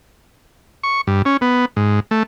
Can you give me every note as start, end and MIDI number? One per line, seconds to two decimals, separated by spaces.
0.83 1.01 85
1.07 1.22 43
1.25 1.37 61
1.41 1.65 59
1.76 2.00 44
2.11 2.23 57